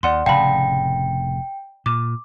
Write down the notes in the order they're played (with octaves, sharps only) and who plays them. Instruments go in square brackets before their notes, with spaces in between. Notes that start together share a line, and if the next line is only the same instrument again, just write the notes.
[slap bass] D#2 [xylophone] D5 F#5 C6
[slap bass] F1 A2 C#3 [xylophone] F5 A5 B5 [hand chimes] G5
[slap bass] A#2 [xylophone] D6